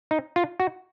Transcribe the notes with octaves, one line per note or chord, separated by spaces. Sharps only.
D#4
F4
F#4